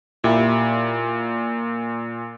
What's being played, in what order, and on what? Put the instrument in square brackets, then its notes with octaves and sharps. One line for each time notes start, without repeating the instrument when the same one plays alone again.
[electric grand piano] A#2 [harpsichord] E4 G4